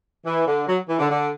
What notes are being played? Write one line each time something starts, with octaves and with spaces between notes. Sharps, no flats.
E3
D3
F#3
E3
D3
D3